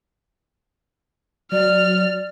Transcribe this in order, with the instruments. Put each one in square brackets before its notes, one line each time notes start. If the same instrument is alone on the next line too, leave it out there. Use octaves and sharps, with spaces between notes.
[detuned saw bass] F#3 [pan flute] D5 [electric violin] F6